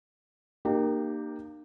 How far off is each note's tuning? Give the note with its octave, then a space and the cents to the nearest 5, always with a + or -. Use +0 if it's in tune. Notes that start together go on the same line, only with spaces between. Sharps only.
A#3 +0 D#4 -45 G4 +0